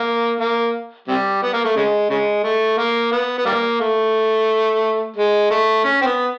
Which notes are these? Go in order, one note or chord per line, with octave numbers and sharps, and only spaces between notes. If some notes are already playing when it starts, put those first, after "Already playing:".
Already playing: A#3
A#3
C3 G3
B3
A#3
A3
C#3 G#3
C#3 G#3
A3
A#3
B3
B3
G3 A#3
A3
G#3
A3
C#4
C4
B3